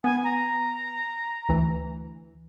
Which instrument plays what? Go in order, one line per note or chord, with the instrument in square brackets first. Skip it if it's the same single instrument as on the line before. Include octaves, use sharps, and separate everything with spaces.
[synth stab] B3 [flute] G#5
[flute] A#5
[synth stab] D2 E3